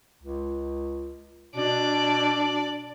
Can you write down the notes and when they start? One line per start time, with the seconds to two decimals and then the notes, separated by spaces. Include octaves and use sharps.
0.22 C#2
1.56 B2 D4 D5